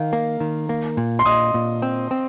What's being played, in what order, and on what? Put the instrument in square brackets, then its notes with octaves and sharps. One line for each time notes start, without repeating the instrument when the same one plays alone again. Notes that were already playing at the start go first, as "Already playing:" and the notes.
Already playing: [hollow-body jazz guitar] D#3 [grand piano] F5
[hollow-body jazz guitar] A#3
D#3
A#3
A#2
[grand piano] C6
[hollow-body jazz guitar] A#2 [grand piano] D#5 D#6
[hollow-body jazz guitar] A#2
C4
C4